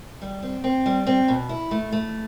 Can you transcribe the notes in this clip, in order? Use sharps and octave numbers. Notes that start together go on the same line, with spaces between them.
G3
C4
C4
G3
C4
B2
E4
A3
A3